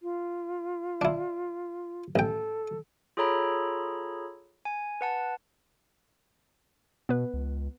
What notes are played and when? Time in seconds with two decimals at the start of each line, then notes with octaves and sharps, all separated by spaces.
0.02 F4
1.01 D4 E4
2.16 A1 A4 G5
3.17 F4 G#4 A4 C#5 A#5 B5
4.65 G#5
5.01 B4 F#5 A5
7.09 B2 B3 B4
7.34 C#2